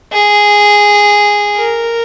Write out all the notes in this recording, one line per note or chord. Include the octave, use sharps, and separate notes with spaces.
G#4
A#4